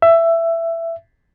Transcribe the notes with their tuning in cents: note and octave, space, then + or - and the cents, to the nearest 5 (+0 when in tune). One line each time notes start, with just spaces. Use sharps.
E5 +15